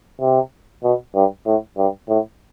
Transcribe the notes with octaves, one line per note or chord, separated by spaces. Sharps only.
C3
B2
G2
A2
G2
A2